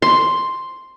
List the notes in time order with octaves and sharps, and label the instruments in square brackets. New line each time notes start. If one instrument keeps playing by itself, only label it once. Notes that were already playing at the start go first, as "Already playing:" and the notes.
[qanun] C6